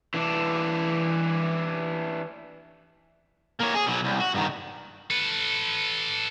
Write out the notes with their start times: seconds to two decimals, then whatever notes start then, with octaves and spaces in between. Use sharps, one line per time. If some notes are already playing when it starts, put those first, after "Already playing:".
0.14 E3 D4
3.60 A#3 C#5
3.75 G#4
3.87 B2 F#3
4.04 C2
4.20 F#4
4.34 G2 D#3
5.10 A4 B4